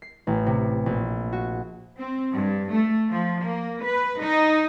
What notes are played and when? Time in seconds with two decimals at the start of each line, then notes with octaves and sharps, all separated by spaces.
0.02 C7
0.27 A1
0.46 C3
0.86 A#1
1.32 F#4
1.96 C4
2.34 G2
2.72 A3
3.09 F3
3.41 A#3
3.82 B4
4.20 D#4